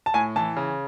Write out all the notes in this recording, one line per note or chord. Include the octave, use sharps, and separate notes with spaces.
A5
A2 G#5
E3 A5
C#3